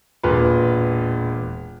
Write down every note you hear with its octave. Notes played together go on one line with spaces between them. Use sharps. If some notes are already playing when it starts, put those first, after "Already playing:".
E1 A#2 B4